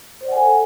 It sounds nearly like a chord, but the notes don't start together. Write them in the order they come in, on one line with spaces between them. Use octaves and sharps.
C5 D5 F#5 G#5 A4